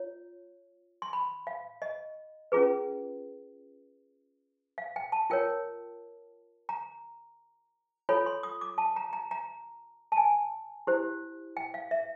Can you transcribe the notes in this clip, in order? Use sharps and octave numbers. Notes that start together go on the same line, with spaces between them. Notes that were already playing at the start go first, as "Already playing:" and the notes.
Already playing: F4 C#5
C6
B5
F5
D#5
C#4 F4 G#4 B4
F5
G5
A5
F4 A#4 C#5 G5
A#5
F4 A4 C#5 B5
C6
D#6
D6
A5
A#5
A#5
A#5
A5
G#5
E4 G4 C5
G5
F5
E5